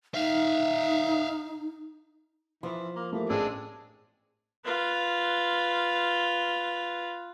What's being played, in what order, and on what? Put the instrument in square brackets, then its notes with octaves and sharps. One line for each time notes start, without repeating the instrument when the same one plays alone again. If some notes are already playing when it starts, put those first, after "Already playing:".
[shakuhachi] D#4 [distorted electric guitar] E5 F5
[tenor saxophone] E3 [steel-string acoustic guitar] F3 [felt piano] C6
[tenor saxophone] A#3
[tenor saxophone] E3 [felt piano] A3 A#3 G4
[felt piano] A1 E6 [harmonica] G#3 D4 [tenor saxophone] C4
[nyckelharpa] F4 B4